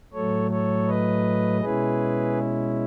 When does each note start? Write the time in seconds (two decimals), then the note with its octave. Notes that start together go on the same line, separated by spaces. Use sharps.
0.13 A2 F#3 A3 A4 C#5
0.51 A4 C#5
0.87 B4 D#5
1.61 B2 G#3 C#4 E4 G#4 B4